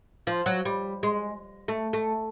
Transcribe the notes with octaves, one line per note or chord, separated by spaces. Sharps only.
F3
F#3
G3
G#3
A3
A3